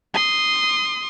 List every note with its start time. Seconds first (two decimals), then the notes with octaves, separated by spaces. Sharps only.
0.14 C6 D#6